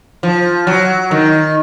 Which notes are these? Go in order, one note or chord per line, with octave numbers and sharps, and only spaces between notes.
F3
F#3
D#3